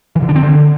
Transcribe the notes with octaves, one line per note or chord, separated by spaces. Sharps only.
E3
D3
D4
C4
D3